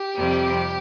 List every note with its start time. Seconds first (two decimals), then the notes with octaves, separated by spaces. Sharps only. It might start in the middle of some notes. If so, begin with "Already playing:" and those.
Already playing: G4
0.16 F2 C3 G3